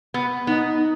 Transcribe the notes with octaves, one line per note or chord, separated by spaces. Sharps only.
B3
B3 D#4